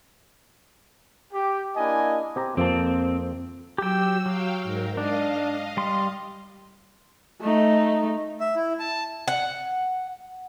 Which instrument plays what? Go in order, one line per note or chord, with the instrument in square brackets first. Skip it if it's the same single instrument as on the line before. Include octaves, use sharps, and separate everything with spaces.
[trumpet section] G4
A#3 D4 E4 D#5 G#5
[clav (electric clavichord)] C4 G4 A#5
[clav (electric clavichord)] F2 A#3 A5 [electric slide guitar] C4
[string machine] F#3 E6 [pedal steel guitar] G4 G5
[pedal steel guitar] F#3 [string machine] F5 G5
[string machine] G#2 A#4
[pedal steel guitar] D4 [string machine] D#5 F5
[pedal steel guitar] G3 C6
[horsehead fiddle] A3 D#4
[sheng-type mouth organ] E5
E4
A5
[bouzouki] F#5